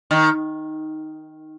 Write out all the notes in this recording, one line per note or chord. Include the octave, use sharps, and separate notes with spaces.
D#3